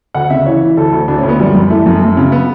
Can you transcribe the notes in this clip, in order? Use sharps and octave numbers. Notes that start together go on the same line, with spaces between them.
D2 F#5
C#3 E5
E3 C#5
E3
D2 A4
D2
D2 D4
C#4
D2
B3
F#2 G3
F#2
E3 A3
F#2
F#2
C#3
B3